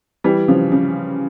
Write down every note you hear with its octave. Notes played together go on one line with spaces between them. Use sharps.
E3 G3
C#3 F3
C#3